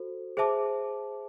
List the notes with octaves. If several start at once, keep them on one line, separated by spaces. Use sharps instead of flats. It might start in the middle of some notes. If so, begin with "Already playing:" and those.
Already playing: F#4 A4 C5
G#4 C5 E5 A5 D6